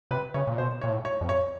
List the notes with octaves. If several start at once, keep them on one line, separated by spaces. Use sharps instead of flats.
C3 B4
C#3 C#5
A#2
B2 C5
A#2 C#5
A2
C#5
F2
C#5